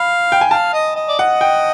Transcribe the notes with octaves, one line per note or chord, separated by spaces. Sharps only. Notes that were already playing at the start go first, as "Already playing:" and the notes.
Already playing: F5 B5
G5
G#5
F5 A5
D#5
D#5
D5
D#5 F#5
G5